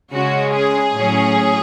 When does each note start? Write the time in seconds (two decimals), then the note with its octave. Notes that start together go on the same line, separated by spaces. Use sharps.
0.12 C#3 G#3 C#4 F#4
0.53 G#4
0.94 A2 F#3 C#4